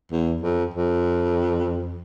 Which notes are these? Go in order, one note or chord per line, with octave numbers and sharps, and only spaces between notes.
E2
F2
F2